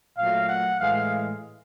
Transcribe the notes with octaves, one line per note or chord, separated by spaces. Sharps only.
A#2 F#3 A3 F5
F#5
A2 E3 G#3 F5